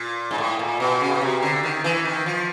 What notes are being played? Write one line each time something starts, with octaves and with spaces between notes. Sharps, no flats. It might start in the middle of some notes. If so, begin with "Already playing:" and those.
Already playing: A#2
G#2
A2
A#2
B2
C#3
B2
C3
D3
D#3
E3
D#3
F3